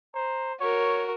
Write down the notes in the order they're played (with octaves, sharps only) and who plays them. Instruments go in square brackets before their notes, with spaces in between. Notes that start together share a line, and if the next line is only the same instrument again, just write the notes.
[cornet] C5 [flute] A#5
[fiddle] F#4 A#4 [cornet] C#5 [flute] C#6